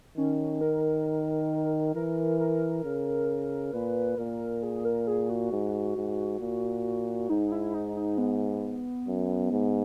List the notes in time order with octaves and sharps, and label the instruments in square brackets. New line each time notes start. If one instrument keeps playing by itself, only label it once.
[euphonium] D#3 [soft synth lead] C#4
[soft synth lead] A#4
[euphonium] E3 [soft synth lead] A#4
[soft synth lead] A#4
[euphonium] C#3
[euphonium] A#2 [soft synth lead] B4
[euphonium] A#2 [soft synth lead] A#4
[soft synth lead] G#4
A#4
G#4
F#4
[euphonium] G#2
G#2
A#2
[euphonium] G#2 [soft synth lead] D#4
[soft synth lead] E4
D#4
D#4
B3
[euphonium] F#2
G#2